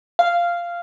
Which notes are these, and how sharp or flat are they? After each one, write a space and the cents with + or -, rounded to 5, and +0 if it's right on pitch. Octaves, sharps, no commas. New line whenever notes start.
F5 -10